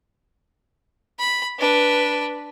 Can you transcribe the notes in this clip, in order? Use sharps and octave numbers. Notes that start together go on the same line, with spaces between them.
B5
D4 B4